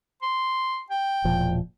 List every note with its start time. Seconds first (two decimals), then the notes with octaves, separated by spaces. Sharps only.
0.23 C6
0.90 G5
1.24 E1 A#2 F3